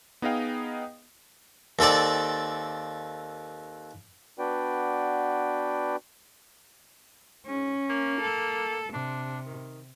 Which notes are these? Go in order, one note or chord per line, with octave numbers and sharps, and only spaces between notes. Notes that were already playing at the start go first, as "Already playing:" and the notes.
B3 D#4 G#4 D#5 F5 G5
D#2 C4 A4 D5
B3 D4 F#4 B4 D5 G5
G#2 C#4
A#3
A4
C3 D4
D#3